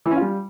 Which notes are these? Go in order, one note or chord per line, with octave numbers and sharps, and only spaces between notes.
E3
C#4
F4
G3